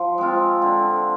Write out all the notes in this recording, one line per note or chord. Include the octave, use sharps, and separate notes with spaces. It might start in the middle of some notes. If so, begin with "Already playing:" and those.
Already playing: F3
G#3 C4 F4
D3